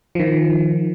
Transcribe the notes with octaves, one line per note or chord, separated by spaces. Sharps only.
D#3 F3